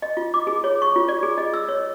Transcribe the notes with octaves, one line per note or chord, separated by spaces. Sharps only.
D#5
F4
D6
G#4
C#5
C#6
F4
D5
G#4
D#5
E6
C#5